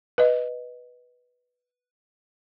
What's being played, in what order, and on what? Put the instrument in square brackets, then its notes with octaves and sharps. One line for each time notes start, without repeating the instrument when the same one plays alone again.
[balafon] B4 D#5